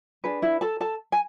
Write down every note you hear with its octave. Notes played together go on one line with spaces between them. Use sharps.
D4 G#4 B4
E4 E5
A4 A5
A4 A5
G#5